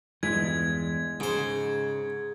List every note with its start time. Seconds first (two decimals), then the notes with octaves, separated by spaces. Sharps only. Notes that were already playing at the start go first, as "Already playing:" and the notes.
0.23 E2 G2 E3 G#3 G#6 B6
1.20 G#2 C#3 C5